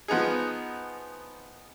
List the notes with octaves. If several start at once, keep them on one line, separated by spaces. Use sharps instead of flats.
F3 B3 D#4 G#4